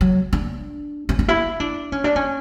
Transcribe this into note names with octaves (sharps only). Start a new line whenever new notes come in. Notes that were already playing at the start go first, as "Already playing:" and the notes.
F#3
D4
C#4
D4
E4
D4
C#4
D4
C#4